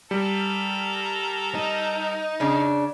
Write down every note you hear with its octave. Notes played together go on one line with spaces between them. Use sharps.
G3 A4 A#4
D#4
C#3 D4